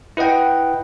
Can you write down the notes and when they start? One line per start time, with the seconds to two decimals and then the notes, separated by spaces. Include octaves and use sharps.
0.17 E4 B4 D#5 F#5 G5